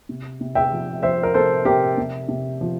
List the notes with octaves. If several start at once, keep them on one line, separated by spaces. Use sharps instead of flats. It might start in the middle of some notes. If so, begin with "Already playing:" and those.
C3
C3
E5 G5
F3
F3 C5 E5
A#4
C3 A4 C5
C3 G4 A#4
C3
C3
F3